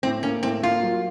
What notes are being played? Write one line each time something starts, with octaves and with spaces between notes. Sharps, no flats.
A2 C4
A#3 C#4
A2 C4
A#3 F4
F#3